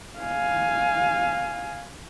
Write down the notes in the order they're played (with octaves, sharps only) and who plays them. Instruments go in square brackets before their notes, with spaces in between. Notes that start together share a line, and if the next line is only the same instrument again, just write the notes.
[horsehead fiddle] F5 G#5